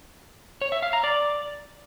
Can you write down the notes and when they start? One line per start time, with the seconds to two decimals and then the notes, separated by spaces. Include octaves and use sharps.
0.61 C#5
0.72 E5
0.83 F5
0.93 A#5
1.04 D5